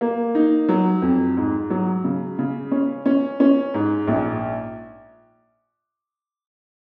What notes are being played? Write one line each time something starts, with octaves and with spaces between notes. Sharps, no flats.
A#3
D#4
F#3
F2
G#2
F#3
C#3
C#3
C#4
C#4
C#4
G#2
A#1